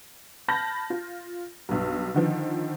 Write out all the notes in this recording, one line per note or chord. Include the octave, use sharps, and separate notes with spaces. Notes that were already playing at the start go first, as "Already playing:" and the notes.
A5 B5 F6 G6 A#6
F4
B1 G2
D3 D#3 F3